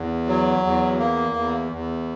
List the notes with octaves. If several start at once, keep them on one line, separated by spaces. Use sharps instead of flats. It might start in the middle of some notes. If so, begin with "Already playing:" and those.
Already playing: E2
F#3
E2
A#3
E2
E2